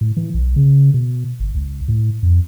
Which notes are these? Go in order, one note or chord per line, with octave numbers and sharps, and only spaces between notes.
A2
E3
B1
C#3
B2
G1
C#2
A2
F2